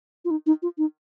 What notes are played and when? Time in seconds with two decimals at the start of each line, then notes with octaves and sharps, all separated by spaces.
0.25 F4
0.31 D#4
0.46 D#4
0.62 F4
0.78 D#4